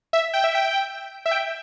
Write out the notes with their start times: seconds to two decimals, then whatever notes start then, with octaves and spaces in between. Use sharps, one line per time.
0.13 E5
0.33 G5
0.44 E5
0.55 G5
1.26 E5
1.31 G5